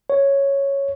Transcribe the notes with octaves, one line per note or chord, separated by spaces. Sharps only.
C#5